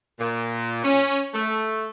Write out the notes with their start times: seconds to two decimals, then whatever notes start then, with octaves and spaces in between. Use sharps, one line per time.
0.20 A#2
0.84 C#4
1.34 A3